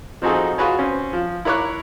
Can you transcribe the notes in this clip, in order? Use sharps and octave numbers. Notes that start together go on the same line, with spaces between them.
F3 C4 D#4 F#4 G#4 A4
F4 F#4 G#4 B4 C#5
C4 C#4
F3
E4 A#4 C#5 D6 F#6